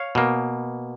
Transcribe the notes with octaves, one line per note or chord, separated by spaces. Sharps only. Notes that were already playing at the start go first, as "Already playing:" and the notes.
Already playing: C#5 F5
B2 A#3